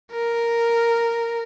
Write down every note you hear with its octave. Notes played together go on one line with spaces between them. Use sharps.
A#4